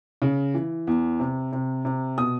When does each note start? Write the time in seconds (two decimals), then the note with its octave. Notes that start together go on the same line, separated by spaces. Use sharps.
0.22 C#3
0.54 E3
0.87 E2
1.20 C3
1.53 C3
1.85 C3
2.18 B2 D#6